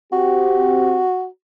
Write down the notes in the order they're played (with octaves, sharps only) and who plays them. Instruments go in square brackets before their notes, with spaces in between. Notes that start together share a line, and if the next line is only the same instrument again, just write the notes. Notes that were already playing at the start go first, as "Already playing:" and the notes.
[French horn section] C4 G4 [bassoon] F#4